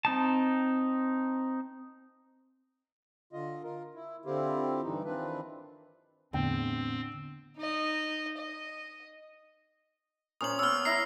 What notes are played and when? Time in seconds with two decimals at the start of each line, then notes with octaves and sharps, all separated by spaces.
0.05 C4 D#4 A5
3.33 D3 F4 D#5
3.63 F4 A#4
3.95 E4
4.25 D3 C4 E4 F4 G4
4.83 G2 D3 E3 D#4
5.04 D#3 E3 C4 D4 F4 B4
6.33 E2 A2 D3 C4 G5
7.57 D#4 D#5
8.37 D#5
10.41 A#2 C#4 C5 D#6 F#7
10.59 B3 C#4 E6 F6
10.85 E4 E5 A#5 C7